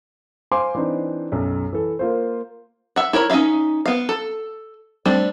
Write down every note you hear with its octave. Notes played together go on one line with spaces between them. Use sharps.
C5 F5 G#5 C6 D6
E3 C4 D4 D#4 C5
B1 F#2
E3 A4
A#3 F4 C5
E5 F#5
E4 A#4 C#5 B5
C#4 D#4 A4 E5 F5
B3 F5
A4
G3 A3 C4 D4